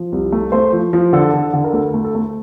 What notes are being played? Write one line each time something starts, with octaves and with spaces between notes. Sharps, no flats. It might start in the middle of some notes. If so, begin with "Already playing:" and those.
Already playing: F3
C2
A3
A3 C5
F3
F3
D3 A4
D3
D3
A#4
D2 A4
A3
A4
A3